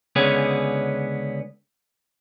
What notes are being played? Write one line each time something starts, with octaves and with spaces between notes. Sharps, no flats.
C#2 D3 B3 C#4 G#4